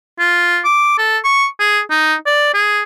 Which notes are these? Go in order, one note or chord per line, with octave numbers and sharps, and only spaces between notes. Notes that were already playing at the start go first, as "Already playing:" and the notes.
F4
D6
A4
C#6
G#4
D#4
D5
G#4